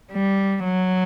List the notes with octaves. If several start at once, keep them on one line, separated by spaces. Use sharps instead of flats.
G3
F#3